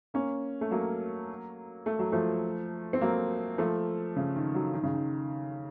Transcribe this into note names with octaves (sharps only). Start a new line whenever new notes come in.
A#3 C#4
A3
F#3 A#3
A3
F#3
F3 A3
C4
F#3 A#3
F3 A3
C#3
D#3
D#3 F#3
D#3
C#3
D#3